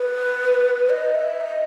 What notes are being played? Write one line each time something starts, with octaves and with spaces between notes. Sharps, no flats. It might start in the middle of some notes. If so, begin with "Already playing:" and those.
Already playing: B4
D#5
E5
D#5